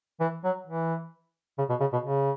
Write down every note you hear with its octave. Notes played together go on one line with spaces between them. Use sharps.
E3
F#3
E3
C#3
B2
C#3
B2
C#3